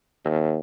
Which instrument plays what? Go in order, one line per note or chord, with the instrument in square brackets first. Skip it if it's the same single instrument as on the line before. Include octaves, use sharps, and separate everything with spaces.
[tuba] D#2